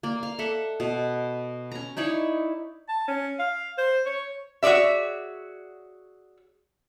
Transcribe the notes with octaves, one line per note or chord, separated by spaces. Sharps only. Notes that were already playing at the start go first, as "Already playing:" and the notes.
A#3 D5
F5
A4 E5 F#5
B2
C#4 A#5
D#4 E4 C#5 D5
A5
C#4
F5
C5
C#5
F#4 G#4 C#5 D5 E5